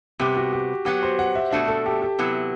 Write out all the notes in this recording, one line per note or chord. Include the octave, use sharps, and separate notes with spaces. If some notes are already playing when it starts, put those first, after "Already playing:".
C3 G3 B3 G4
F#4
G4
F#3 B3 F#4 G4
C5
F#5
E5
B2 A3 D4 F#4 E5
A4
G4
G4
C3 F#3 B3 E4